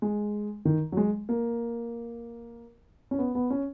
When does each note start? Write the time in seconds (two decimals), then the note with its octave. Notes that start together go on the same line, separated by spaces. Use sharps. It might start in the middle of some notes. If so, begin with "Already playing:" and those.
0.02 G#3
0.65 D#3
0.92 F#3
0.97 G#3
1.29 A#3
3.11 C#4
3.19 B3
3.35 B3
3.50 C#4